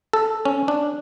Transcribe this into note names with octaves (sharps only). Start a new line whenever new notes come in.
A4
C#4
D4